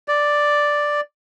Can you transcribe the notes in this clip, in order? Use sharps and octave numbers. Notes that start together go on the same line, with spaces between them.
D5